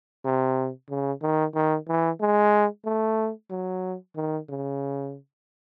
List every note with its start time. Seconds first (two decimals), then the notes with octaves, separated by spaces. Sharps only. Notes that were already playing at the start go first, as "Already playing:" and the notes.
0.25 C3
0.89 C#3
1.22 D#3
1.54 D#3
1.88 E3
2.20 G#3
2.85 A3
3.50 F#3
4.16 D#3
4.49 C#3